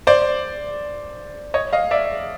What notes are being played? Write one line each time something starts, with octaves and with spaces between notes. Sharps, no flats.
C5 D5
C#5 D#5
D#5 F5
D5 E5